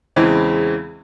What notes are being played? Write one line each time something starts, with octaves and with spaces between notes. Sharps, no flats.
E2 C#3 E3 G#3 C4